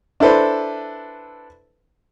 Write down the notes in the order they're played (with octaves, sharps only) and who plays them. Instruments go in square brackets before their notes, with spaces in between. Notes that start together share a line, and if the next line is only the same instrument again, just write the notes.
[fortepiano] D4 E4 A4 B4 C5